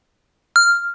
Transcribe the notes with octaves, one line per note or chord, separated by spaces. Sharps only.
F6